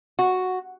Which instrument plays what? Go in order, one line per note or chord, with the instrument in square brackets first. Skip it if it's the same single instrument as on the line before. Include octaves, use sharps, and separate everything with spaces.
[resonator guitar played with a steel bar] F#4